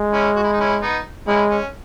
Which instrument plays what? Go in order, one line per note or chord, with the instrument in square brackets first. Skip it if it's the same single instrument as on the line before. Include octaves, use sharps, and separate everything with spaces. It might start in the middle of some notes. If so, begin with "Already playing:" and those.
Already playing: [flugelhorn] G#3
[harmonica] C#4 E4
F#4
E4
D#4
C#4 E4
B3 D#4
[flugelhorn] G#3 [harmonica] C#4 E4
[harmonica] C#4